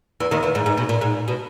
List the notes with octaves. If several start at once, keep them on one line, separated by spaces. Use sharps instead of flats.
E2 E3
D#2 D#3
E2 E3
G#2
G#2
B2
A#2
G#2
B2